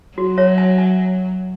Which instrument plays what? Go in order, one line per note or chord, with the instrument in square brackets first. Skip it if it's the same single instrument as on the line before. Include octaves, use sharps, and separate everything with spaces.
[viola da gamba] F#3 [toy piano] F#4
[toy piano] C#5 E5
E5 G#5
E5 G#5